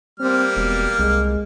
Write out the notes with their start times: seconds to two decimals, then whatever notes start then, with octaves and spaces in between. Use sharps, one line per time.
0.20 G3 A#3 C4 F6
0.57 E1 B2
0.99 C2 G#3